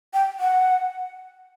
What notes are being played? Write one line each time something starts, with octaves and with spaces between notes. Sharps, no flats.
G5
F#5